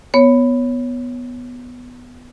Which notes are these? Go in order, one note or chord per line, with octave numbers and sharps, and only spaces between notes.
B3 C#5